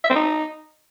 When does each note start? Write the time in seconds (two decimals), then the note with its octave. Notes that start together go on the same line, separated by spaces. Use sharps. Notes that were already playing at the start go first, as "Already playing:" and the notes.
0.04 E5
0.10 C4
0.16 D#4